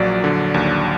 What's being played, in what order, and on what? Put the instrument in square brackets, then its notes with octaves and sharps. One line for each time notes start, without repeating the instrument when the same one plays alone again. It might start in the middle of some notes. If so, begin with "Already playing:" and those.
Already playing: [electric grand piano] A#1 A#2 F#3 D5
D3
D#2